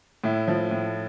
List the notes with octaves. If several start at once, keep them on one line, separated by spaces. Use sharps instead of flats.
A2 E4
F3
A2